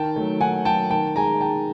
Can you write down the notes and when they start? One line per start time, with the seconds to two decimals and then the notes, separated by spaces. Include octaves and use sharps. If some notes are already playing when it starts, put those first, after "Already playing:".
Already playing: D#3 G5 A5
0.16 F#3 A3
0.40 D#3 F#5 G#5
0.65 F#3 A3 G5 A5
0.90 D#3 G5 A5
1.16 G#3 G#5 A#5
1.41 D#3 G5 A5